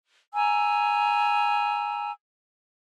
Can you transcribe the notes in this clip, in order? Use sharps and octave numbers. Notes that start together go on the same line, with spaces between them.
G#5 A#5 E6